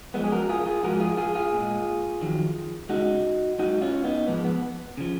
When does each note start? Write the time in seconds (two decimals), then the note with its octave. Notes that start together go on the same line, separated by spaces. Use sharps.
0.14 F#2 F3 G#3 B3
0.24 G#4
0.32 F#4 A#4
0.49 F4 G#4
0.66 F4 G#4
0.83 G#2 F3 G#3 F#4 A#4
1.00 F4 G#4
1.17 F4 G#4
1.35 F4 G#4
1.53 A#2 G#3
2.21 F2 D#3 F#3
2.89 C#2 C#3 G#3 D#4 F#4
3.58 G#2 F#3 D#4 F#4
3.82 C#4 F4
4.04 B3 D#4
4.27 G#2 F3 G#3 B3
4.44 B3
4.97 C#3 F3